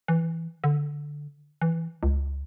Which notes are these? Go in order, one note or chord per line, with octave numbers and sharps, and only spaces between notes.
E3
D3
E3
C#2